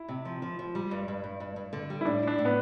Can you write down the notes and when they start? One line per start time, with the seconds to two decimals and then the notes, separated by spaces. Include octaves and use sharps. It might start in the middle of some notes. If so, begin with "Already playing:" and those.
Already playing: E4
0.08 C3
0.25 F3
0.42 F3
0.59 F3
0.75 G3
0.91 G2
1.08 G2
1.24 G2
1.40 G2
1.56 G2
1.73 D3
1.90 G3
2.01 E4
2.05 A2 D4
2.23 D4 E4
2.38 A2
2.45 B3